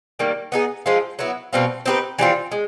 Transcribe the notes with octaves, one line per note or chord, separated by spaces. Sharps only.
D#3 G3 A#3
B3 D#4 G#4
F3 G#3 C4 F4
F#3 B3 E4
B2 G3 C4 F4
C4 D#4 G4 B4
E3 G3 C4 F4
G#3